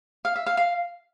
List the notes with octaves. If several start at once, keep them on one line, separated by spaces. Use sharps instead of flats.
F5
E5
F5
F5